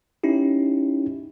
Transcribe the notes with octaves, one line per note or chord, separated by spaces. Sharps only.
C#4 D#4 E4 G4